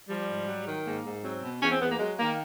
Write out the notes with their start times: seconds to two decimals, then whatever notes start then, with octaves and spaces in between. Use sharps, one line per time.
0.09 F3 G3
0.28 G#2
0.48 F#3
0.67 D#3
0.85 G#2 A#3
1.05 G#2
1.23 F#3 C4
1.43 B2
1.62 E2 C#4
1.71 C4
1.81 E2 B3
1.90 A#3
1.99 F#3 G#3
2.19 D#3 A#3